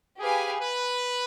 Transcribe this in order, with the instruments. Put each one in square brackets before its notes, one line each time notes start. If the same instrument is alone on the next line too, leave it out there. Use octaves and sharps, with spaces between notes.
[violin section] G4 B4 F5 G#5 [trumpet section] G#4
[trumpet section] B4